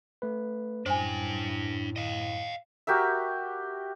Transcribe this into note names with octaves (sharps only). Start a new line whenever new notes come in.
A3 B4
F#2 A2 D4 C5 G5 G#5
D#5 F5
F#4 G4 A#4 E5